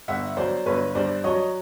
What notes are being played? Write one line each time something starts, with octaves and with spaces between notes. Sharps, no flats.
G1 E5 F#5
F#3 C5 D5
G1 B4 C#5
G2 C5 D5
F#3 C#5 D#5